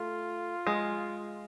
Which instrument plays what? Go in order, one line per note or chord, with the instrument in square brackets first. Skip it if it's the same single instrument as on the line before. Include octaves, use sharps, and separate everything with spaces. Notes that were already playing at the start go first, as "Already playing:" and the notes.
Already playing: [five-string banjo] A3 [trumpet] F4
[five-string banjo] G#3